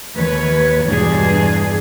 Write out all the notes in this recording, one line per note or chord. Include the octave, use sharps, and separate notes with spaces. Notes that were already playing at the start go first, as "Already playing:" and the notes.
D#2 B4 C#5
E2 G2 B2 D4 G#4